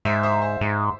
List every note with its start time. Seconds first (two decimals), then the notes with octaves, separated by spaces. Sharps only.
0.05 G#2 C5 E5
0.23 C5 E5
0.42 C5
0.61 G#2